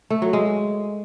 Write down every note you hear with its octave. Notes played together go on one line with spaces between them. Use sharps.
A3
F#3
G#3